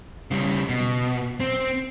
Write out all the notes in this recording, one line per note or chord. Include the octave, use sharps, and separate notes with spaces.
C#3 G3
B2
C4